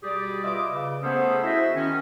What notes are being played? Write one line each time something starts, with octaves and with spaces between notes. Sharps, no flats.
B2 G3 G4 G#4 D5
F4 B4 D#5 E5 D6
C#3
A3 B3 C#4 G#4 A4 C5
E4 F#4 G#4 C5 D#5 E5
D#3 C#4